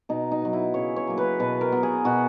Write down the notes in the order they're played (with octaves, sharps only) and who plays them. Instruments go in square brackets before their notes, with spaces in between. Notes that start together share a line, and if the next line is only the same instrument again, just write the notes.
[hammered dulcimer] B2 D#4
D#4
F#3 B3
E4
C#3 C#5
C#5
F#3 A#3
B4
B2 B4
A#4
F#3 B3
G#4
B2 F#4